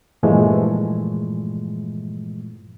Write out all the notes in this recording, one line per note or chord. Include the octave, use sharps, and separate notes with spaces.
G2 A#2 E3 F3 G#3 A3